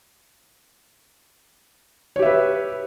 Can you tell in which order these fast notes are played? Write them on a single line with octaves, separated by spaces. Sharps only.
C#5 G4 E5 B4